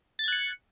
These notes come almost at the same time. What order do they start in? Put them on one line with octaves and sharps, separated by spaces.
A6 G#6 F#6 C#7